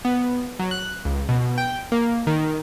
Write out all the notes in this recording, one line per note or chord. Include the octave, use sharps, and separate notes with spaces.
B3
F#3
F#6
C#2
B2
G5
A#3
D#3